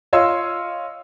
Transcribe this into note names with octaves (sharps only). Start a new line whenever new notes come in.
F4 C#5 D#5 C6 E6